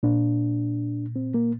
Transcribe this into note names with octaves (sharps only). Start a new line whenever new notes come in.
A#2 D4
C4
A#3